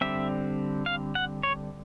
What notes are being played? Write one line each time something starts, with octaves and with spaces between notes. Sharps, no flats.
D3 G3 C4 E5
F5
F#5
C#5